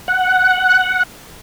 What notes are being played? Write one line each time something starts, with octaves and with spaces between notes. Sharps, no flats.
F#5